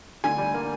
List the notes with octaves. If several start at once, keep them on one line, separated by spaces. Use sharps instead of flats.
D3 G#5
G3
A#3